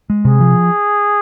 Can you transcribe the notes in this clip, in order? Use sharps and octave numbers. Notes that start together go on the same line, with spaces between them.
G#3
C3 G#4
F3